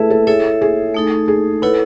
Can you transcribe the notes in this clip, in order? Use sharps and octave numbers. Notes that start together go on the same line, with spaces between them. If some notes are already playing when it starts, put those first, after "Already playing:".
Already playing: A3 E4 G#4 A4 B4 E5
A4
E4 G#4 A4 C#5 E5
G#4
A3 D#4 A4
G#4
E4 A4 B4 C#5 F#5